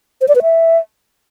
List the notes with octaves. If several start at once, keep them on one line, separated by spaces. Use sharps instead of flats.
C5
D5
B4
E5